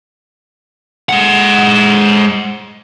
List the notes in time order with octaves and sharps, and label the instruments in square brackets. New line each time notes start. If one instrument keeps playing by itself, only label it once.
[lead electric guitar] G#3 F#5